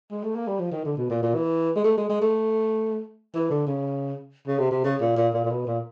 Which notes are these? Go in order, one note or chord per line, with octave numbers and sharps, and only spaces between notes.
G#3
A3
A#3
G3
F3
D#3
D3
B2
A#2
A#2
E3
G#3
A3
G#3
G#3
A3
E3
D3
C#3
C#3
C3
C3
C#3
A#2
A#2
A#2
A#2
B2
A#2